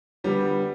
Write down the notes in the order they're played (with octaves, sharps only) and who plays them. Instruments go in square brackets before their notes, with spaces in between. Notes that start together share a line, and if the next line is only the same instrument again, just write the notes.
[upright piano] D3 G3 B3